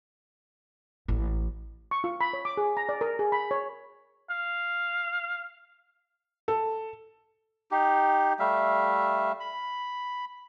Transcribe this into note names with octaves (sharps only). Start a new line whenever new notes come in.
A1
C#6
F4
B5
C#5
D6
G#4
A#5
D5
A#4
G#4
B5
C#5
F5
A4
D#4 G4
G3 A3 E5 F5
B5